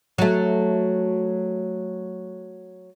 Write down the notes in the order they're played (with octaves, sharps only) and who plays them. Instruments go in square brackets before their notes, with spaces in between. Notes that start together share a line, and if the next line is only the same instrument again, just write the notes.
[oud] F#3 A3